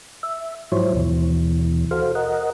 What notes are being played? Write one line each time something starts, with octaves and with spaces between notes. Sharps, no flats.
E5
G#2 F3 F#3 E4 C5 C#5
D#2 B2 E3
F#4 A4 C5 F5
A#4 D#5 F#5